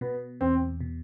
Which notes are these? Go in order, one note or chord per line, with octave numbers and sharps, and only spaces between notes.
B2 B3
E2 C4
B2